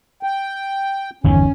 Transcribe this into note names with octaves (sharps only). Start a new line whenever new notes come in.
G5
G1 E2 D#3 C#4